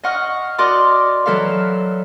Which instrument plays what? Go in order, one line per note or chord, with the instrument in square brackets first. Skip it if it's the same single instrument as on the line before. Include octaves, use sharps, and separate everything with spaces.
[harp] D#5 F5 F#5 C#6 F6
F#4 A#4 D5 D#5 C6 D6
E3 F#3 A4 A#4 F5